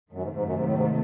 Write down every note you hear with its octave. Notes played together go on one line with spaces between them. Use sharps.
F#2 C3 D#3 F#3 A3
G#2
G#2
F#2
G#2
A2
G#2